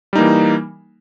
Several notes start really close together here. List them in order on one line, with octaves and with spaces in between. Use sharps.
G3 D#4 A#3 E3